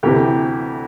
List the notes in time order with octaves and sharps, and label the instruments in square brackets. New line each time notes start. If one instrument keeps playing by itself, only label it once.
[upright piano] D2 C3 E3 G4